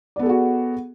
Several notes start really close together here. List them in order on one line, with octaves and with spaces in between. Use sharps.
D5 B3 A4 G#4 F#4